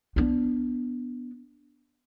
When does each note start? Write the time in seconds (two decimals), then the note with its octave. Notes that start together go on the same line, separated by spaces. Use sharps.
0.16 B3 D4